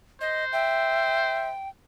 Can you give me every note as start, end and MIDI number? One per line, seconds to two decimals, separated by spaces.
0.21 1.57 72
0.21 0.45 75
0.53 1.49 76
0.53 1.68 79